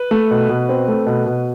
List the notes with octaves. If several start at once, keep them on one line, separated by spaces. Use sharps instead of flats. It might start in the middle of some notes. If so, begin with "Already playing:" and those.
Already playing: B4
A3
B2
B2
C4
A3
B2
B2